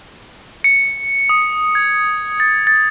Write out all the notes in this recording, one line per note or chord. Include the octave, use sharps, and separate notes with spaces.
C#7
D#6
G#6
A6
A6